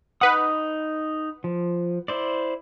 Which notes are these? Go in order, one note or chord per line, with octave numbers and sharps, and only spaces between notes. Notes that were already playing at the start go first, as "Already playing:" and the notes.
D#4 B4 F#5 D#6
F3
E4 C5 D5